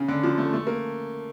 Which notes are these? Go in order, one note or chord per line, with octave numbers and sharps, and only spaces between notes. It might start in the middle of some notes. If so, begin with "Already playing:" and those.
Already playing: C#3
D3
F3
A3
A3
A#3